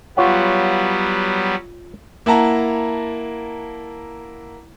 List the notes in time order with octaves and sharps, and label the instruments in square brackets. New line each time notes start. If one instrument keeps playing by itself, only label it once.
[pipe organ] F#3 G3 B3 [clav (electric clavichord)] F4 C#5 F#5
[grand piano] A#3 E4 F#5 A5 A#5